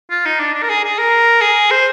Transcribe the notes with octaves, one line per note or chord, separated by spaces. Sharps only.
F4
D#4
D4
D4
A#4
G#4
G#4
A#4
G#4
C5